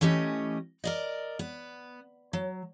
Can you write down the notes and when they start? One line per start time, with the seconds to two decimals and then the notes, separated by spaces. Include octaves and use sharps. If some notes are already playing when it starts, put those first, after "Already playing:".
0.01 E3 A3 C#4 G4 D#5
0.84 A#4 D5 D#5
1.39 B3
2.33 F#3